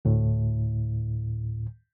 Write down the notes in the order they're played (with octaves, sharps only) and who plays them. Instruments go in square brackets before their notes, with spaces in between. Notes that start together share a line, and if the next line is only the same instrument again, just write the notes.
[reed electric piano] D2 A2